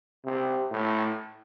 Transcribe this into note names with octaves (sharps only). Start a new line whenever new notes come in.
C3
A2